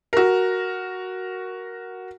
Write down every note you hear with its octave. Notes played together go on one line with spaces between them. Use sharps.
F#4 A#4